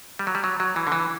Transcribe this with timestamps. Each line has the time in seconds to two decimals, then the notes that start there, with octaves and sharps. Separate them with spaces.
0.19 G3
0.27 F#3
0.35 G3
0.44 F#3
0.60 F#3
0.76 E3
0.87 D3
0.92 E3